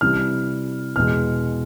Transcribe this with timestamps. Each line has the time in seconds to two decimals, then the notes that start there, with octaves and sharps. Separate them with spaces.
0.01 C3 E3 G3 F6
0.96 E2 B2 G#3 F6